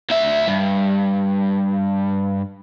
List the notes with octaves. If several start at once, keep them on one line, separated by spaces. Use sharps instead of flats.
D2 E5
G2